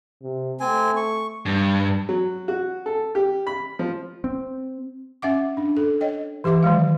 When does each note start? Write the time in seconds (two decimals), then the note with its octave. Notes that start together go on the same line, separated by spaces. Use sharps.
0.23 C3
0.60 A3 C4 G#5
0.96 C#6
1.46 G2
2.09 F#3
2.48 F#4
2.86 A4
3.15 G4
3.47 B5
3.79 F3
4.24 C4
5.22 C#4 E5 F#5 D6
5.57 D4
5.77 A4
6.01 C#5 D#5 G5
6.44 E3 G4 E5 D6
6.63 D#3 F#3 G#3 F5